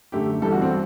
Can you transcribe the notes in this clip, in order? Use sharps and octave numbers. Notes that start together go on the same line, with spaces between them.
F#2 D3 A3 G4
G1 G2 E3 G3 A4
F#4
C4